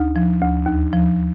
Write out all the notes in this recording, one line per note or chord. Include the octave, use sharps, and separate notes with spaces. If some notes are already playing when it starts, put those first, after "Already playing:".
Already playing: D2 D#4
F3
D2
D#2
F3